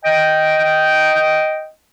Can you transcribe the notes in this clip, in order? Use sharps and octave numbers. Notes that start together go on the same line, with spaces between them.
D#5 G5